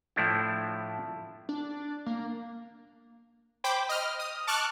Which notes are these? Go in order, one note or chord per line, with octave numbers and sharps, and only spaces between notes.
A2 F3 A3 D4 E4
D4
A#3
C5 G5 B5 D6
D#5 F6
D#6
A5 C#6 D6 F6 F#6